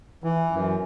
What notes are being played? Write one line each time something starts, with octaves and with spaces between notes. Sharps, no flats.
E3
F#2